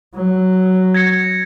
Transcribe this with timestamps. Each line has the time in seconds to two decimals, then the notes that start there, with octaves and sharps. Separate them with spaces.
0.15 F#3
0.94 G#6 A#6 C#7